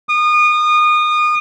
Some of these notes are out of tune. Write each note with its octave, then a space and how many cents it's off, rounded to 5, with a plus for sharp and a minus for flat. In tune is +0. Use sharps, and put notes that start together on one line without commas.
D#6 -30